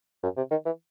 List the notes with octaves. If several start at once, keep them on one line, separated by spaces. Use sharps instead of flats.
F#2
C3
D#3
E3